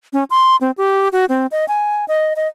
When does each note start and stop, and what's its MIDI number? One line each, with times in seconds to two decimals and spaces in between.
0.13 0.24 61
0.30 0.56 84
0.61 0.71 60
0.78 1.09 67
1.12 1.25 66
1.29 1.47 60
1.51 1.65 75
1.68 2.05 80
2.08 2.33 75
2.36 2.48 75